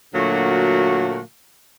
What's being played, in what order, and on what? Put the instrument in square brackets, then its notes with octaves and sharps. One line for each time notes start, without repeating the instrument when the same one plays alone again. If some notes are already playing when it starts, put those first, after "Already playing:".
[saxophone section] A#2 D3 F#3 A3 A#3 F#4